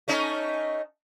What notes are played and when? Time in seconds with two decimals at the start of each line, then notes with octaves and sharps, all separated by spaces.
0.08 A3 C#4 D#4